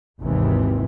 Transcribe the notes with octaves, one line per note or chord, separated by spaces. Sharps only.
G#1 D#2 C3 E3